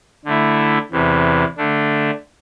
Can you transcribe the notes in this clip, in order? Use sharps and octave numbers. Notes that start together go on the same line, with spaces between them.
D3 A3 E4
E2 C3 E3
D3 A3 D4